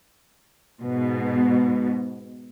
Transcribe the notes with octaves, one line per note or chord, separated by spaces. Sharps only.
G#2 B2